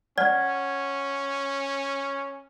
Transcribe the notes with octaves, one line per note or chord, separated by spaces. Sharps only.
C#4 D5 F#5 F6 G#6